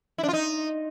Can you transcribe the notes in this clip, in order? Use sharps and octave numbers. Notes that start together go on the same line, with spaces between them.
E4
D4
F4
D#4